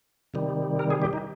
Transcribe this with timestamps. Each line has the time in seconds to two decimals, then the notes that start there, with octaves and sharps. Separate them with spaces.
0.34 C3 D#3 G3
0.79 A#4
0.90 G#4
1.02 G4
1.13 D#4